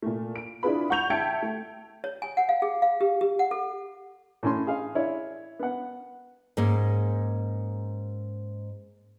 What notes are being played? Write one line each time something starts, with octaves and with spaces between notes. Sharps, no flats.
A#2 A3
D7
D4 E4 F4 G#4 B4 B5
F#5 C#6 G6 F7
E5 G5 A5 G#6 C#7 D7
A3
C#5
G#5
F#5
F5
G#4
F5
G4
G4
F#5
A4
A2 C#4 C6
G#4 F5
E4 C#5 D5
B3 F#5
G#2 A#3 C#4